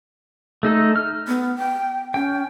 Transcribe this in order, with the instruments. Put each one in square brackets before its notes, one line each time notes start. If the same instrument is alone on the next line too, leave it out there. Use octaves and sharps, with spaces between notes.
[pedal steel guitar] A3 D#4 A4
F6
[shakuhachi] B3
G5
[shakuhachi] C#4 [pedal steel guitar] G5